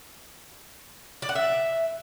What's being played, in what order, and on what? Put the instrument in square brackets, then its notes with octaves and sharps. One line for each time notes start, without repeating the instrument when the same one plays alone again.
[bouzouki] D5
F#5
E5